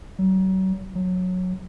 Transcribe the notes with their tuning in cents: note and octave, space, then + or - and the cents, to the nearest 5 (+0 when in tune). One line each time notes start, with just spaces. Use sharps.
F#3 +35
F#3 -15